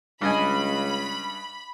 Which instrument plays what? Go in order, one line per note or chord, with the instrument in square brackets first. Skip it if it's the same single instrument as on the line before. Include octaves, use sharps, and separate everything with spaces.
[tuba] C#2 [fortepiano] G2 D#5 G#5 [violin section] B5